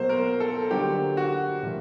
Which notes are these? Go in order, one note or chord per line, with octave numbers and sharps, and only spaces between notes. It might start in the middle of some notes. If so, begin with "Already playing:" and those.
Already playing: B2 F#3 A#3 C5
A#4
A4
D3 F#3 A#3 G4
F#4
A2 F3 A#3